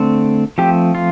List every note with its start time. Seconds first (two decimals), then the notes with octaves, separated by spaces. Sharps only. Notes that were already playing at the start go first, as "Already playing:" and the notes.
Already playing: D3 A3 C4
0.58 F3 A3 C4 G4
0.95 F4